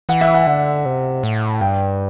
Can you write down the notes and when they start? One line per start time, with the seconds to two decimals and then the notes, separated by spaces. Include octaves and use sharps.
0.09 E3 F#5
0.21 E5
0.34 F#5
0.47 D3
0.85 C3
1.23 A2
1.61 G2 G5